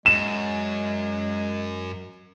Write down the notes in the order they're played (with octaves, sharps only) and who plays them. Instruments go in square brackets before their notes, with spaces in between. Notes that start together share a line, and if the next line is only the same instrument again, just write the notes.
[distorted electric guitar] F#2 [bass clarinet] G#3 [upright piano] E7